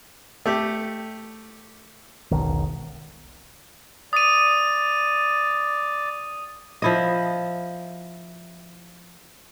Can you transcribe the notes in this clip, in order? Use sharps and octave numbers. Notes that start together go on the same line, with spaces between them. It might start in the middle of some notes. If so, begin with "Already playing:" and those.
A3 G4
E1 B1 D#3
D5 D#6 D#7
F3 E4 D#5